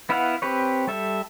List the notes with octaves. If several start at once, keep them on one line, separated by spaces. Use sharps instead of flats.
B3 E4 B4 F5 F#5
C4 G4 B4 C#5
G3 A4 E5